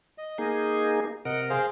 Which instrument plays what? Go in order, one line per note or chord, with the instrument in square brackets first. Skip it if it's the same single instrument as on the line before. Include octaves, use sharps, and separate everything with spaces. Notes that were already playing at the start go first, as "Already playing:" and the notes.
[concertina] D#5
[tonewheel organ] A#3 D#4 G#4
[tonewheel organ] C3 A#4 [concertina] D#5 F#5
[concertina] G#4 C5 F5